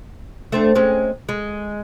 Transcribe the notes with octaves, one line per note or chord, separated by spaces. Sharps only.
A3 C4 D4
G#3 C4 C#4
G#3